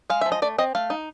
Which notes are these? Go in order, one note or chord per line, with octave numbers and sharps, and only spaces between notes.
G#3 F5
F3 E5
D#5
A3 D5
C4 D#5
A3 F5
D#4